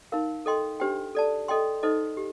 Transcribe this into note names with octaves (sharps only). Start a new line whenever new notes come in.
D#4 A#4 F5
A4 D#5 G5 C6
D4 G4 C5 G5
A4 D5 A5
A4 D#5 G5 C6
D#4 A4 C5 D#5
G4